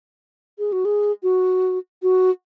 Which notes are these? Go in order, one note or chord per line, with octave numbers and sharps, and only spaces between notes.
G#4
F#4
G#4
F#4
F#4